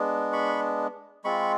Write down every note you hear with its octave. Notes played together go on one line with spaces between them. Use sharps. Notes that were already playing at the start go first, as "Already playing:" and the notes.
Already playing: G#3 B3 D4
B5 C#6
G#3 C4 F4 B5 C#6